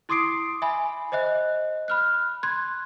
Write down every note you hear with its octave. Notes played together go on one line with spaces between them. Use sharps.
E4 C6 D6 D#6 C7 D7
E5 G#5 B5
C5 D#5 E5 F#6
B5 F6 F#6
C6 F#6 G#6